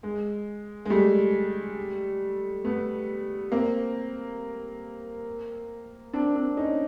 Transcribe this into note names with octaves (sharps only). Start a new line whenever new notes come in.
G#3
G#3
G3 A3
A3 B3
A#3 C4
C4 D4
C4 D4
C#4 D#4